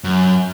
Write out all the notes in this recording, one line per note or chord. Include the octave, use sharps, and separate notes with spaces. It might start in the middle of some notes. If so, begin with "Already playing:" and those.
F#2